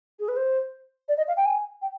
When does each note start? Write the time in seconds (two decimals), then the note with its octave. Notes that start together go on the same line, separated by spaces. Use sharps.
0.19 G#4
0.28 B4
0.36 C5
1.08 D5
1.17 D#5
1.27 F5
1.37 G5
1.45 G#5
1.81 G5